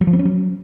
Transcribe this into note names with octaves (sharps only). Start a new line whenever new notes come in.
F#3
F3
C4
C#4
F#3